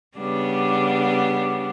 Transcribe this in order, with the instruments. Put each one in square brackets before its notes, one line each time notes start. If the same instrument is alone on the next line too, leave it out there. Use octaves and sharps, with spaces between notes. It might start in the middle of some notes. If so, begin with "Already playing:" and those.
[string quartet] C#3 G3 B3 D4